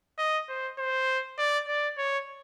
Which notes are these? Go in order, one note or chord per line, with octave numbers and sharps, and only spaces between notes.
D#5
C5
C5
D5
D5
C#5